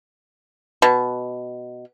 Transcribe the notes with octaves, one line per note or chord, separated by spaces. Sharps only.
B2